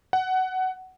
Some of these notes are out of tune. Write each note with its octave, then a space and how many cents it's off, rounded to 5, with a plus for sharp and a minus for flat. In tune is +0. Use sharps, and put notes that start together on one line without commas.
F#5 +15